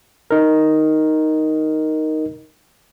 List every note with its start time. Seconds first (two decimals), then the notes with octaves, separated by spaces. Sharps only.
0.31 D#4 A#4